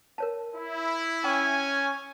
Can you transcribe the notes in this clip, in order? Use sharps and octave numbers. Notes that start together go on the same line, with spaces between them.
A#4 C#5 A5
E4
C#4 G5 G#5